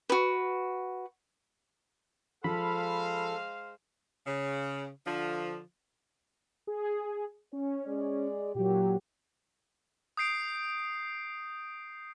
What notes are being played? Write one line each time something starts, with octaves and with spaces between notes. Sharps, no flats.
F#4 B4
F3 G#3 A4 C5 F5 B5
C#3
D3 F3
G#4
C#4 C#5
G#3 G#4 D5
A#2 F#3 G4
D#6 G6 C7 D7